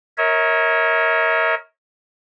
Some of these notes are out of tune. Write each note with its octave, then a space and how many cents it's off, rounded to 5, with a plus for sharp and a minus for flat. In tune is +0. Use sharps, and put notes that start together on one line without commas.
A#4 +0 C#5 -10 E5 -45